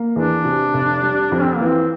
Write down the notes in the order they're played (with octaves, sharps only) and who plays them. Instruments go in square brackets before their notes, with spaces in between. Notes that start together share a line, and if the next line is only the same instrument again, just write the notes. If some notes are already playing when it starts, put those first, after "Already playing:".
Already playing: [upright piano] A#3
[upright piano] E2 [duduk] D4
[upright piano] C3
F1
G3
[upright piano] F2 [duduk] D4
[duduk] C4
A#3
[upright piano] E3
[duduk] C4